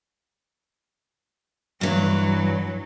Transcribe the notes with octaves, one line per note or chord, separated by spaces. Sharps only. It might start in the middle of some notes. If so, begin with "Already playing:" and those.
G2 E3 F#3